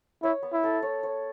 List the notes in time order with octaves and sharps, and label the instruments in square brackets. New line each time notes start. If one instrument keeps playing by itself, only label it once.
[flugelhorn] E4 [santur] C#5
[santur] B3
[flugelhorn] E4
[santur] A4
C#5
C#5